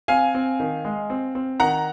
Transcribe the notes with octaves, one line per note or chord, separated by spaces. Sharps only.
C4 F5 G#5
C4
D#3
G#3
C4
C4
D#3 F#5 A#5